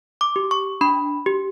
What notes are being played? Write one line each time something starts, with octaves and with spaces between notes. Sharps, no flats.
D6
G4
C#6
D4 B5
G4